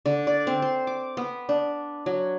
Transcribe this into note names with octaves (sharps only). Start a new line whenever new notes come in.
D3
D5
C4
C5
D6
B3
D4
F#3